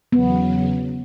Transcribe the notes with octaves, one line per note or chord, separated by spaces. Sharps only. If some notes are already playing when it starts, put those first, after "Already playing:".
E2 C#3 F#3 B3